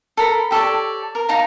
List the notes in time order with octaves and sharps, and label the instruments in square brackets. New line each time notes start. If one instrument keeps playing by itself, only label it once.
[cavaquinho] A4 A#4 B5
G4 A4 C#5 D5
A#4
D#4 F5 A5 A#5